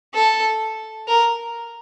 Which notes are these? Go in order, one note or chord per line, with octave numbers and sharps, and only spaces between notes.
A4
A#4